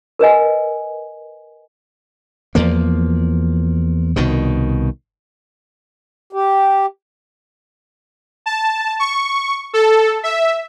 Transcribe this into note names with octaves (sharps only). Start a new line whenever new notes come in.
A#4 B4 D#5 G#5
E2 F3 A#3
C2 B2 D#3
G4
A5
C#6
A4
E5